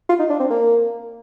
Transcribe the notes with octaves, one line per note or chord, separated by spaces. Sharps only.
F4
D#4
D4
C4
A#3